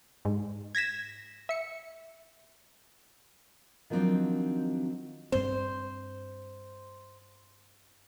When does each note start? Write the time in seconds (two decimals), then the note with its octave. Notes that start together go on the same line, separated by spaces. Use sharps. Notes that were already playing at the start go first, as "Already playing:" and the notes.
0.25 G#2
0.75 G#6 A#6 B6 E7
1.49 E5 C#7
3.90 D#3 F3 F#3 C4 D4 D#4
5.32 G2 C4 C5